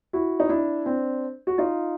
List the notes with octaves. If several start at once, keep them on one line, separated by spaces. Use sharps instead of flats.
E4 F#4
D#4
D4 E4
C4 D4
F#4
D#4 F4